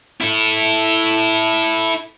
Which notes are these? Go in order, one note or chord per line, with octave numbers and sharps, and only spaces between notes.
E4 A4